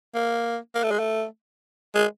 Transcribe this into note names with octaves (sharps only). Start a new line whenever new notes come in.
A#3
A#3
A3
G#3
A3
G#3